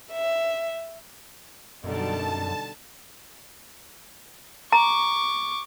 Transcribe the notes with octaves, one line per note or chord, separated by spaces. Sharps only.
E5
F#2 B2 D3 G3 D#4 A5
A#5 C#6 D6